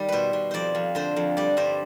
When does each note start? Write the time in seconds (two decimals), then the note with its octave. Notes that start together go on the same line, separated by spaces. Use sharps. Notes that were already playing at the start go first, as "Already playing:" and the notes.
Already playing: D#3 G3
0.09 B2 B4 C5
0.33 B2
0.51 F2 C5 D5
0.75 F2
0.95 D3 C5
1.16 F2
1.37 G3 D5
1.57 G2 C5